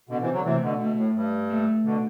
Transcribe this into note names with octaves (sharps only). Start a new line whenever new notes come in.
B2 D3
C3 E3
D3 F#3
C3 E3 A3
B2 D3
B2 A3
A2
G2
A3
B2 D3